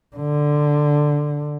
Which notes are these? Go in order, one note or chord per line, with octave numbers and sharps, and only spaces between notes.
D3